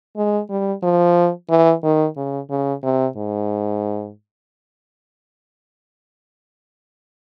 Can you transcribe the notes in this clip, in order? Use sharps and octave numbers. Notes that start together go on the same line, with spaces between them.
G#3
G3
F3
E3
D#3
C#3
C#3
C3
G#2